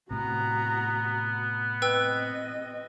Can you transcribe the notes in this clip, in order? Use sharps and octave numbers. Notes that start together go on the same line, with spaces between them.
A2 C3 B3 F#4 A#5
C4 B4 D#5 G5 E6